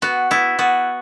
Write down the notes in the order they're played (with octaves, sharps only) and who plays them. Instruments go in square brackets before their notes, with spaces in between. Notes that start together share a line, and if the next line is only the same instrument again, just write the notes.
[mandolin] B3 [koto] F#4
[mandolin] B3 [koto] E4
[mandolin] B3 [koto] F#4